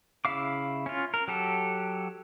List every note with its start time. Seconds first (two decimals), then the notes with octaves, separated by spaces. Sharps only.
0.25 C#3 E4 E5 F5 D6
0.86 C#4 F4
1.14 A#4
1.28 F#3 G4 A4